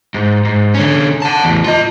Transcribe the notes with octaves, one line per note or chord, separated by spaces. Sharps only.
G#2
G#2
D3 C#4
F#5 A5
E2 A2
F4 D#5